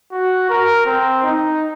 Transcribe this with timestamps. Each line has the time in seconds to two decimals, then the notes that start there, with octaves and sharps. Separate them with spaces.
0.12 F#4
0.50 A#4
0.86 C4
1.23 D#4